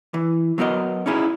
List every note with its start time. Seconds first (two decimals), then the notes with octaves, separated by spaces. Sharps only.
0.14 E3
0.58 F#3 B3 F#4 A#4 D#5
1.06 C#4 D#4 E4 G#4